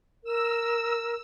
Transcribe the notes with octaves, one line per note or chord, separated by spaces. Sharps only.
A#4 E6